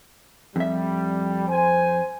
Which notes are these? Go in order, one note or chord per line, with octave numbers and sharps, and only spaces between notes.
F2 G3 E5
C5 G#5